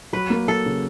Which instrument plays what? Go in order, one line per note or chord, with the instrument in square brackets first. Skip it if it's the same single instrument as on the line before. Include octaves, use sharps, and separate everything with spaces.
[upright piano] F#3 [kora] B4
[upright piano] A#3
[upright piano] F#3 [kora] A4
[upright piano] C#3